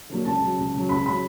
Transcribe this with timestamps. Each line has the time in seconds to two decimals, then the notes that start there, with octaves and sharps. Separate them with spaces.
0.09 D3 F#3 A#3
0.25 C#2 A5
0.42 C#3 F#3
0.58 C#2
0.74 C#3 F#3
0.89 C#2 B5
1.05 C#3 F#3 B5